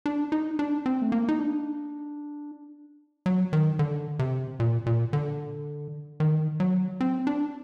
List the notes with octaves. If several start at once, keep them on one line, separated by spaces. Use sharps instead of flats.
D4
D#4
D4
C4
A3
A#3
D#4
D4
F#3
D#3
D3
C3
A#2
A#2
D3
D#3
F#3
C4
D4